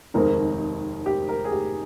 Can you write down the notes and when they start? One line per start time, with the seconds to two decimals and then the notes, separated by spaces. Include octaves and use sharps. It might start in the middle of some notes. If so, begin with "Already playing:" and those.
0.14 F1 D#2 D#3 G#3 C4 A#4
1.06 G4
1.29 A#4
1.45 G#4
1.51 G4